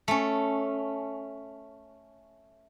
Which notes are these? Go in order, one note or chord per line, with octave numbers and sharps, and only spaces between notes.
A3 C#4